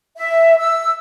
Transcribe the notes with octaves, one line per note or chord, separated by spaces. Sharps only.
E5
E6